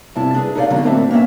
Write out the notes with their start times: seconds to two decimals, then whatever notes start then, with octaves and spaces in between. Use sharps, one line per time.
0.15 G2 C3 E4 A5
0.34 D4 G#4 B4
0.55 D#4 G4 B4 C#5 D5 F5
0.70 G#2 B2 D3 F#3 C#4
0.83 D2 A2 A#3 C4 D4 E5
1.11 A#3 B3 C#4 E5